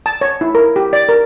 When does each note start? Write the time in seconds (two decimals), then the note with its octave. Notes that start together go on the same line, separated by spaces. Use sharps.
0.06 A5
0.21 C#5
0.41 E4
0.55 A#4
0.76 G4
0.93 D5
1.09 A#4